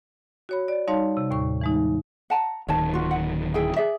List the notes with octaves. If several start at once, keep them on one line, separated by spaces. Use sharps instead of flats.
F#4 C#5 B5
D5
G3 D#4 C#5 F5 A5 C6
C3
D#2 A2 C#6
E3 G#3 D#4
F#5 A5 A#5
D1 D#3 C#5 A5
F4 F#4
F#5
E4 G#4 G5
G#4 D5 E5